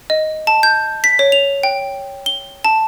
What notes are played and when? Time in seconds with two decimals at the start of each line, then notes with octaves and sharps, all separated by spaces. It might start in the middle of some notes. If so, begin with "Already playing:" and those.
0.10 D#5
0.47 A5
0.63 G6
1.04 B6
1.19 C#5
1.32 F7
1.63 G5
2.26 G7
2.65 A5